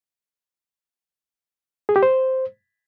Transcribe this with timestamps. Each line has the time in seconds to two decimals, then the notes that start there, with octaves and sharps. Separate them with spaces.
1.89 G#4
1.96 G4
2.03 C5